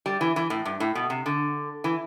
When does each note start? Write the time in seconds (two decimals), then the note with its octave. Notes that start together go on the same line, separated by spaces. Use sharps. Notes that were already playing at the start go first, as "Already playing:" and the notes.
0.06 G3
0.21 E3
0.36 E3
0.50 A2
0.65 G2
0.80 A2
0.95 B2
1.10 C3
1.26 D3
1.84 E3